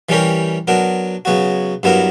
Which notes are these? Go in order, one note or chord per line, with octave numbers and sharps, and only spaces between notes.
E3 G3 C#4 G4 A#4
F#3 B3 D4 A#4
C#3 F#3 B3 F#4
G2 F#3 B3 E4 A#4